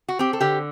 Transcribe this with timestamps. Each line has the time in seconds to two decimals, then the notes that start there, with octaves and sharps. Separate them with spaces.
0.09 F#4
0.19 C4 G4
0.33 A4
0.40 D3 G4